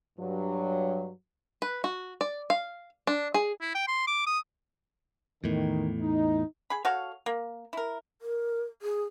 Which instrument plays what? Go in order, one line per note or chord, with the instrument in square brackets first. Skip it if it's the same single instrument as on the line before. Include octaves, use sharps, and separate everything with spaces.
[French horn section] G2 F#3
[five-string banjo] B4
F#4
D5
F5
D4
G#4
[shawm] E4
G5
C6
D6
D#6
[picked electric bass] E2 A2 [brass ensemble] D#3
[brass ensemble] D#4
[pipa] G#4 B5
F#4 A4 C#5 F5
A#3
E4 A#4
[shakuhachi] A#4
G#4